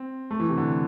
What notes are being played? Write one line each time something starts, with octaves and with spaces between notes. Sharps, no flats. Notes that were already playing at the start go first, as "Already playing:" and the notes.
Already playing: C4
A3
E3
C3
D3